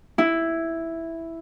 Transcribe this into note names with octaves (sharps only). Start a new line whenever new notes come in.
E4